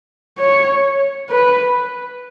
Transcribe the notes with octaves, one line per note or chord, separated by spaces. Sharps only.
C#5
B4